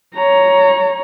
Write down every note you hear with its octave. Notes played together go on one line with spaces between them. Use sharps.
C#5 A#5